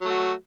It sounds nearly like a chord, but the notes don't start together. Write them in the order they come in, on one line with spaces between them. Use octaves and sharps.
F#3 A3 F#4